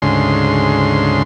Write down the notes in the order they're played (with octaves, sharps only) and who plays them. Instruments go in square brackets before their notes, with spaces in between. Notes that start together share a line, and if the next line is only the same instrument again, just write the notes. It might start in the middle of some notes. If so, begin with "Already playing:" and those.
[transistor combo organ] D2 G#2 C#3 C6